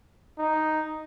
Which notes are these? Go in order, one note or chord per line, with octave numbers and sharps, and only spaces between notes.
D#4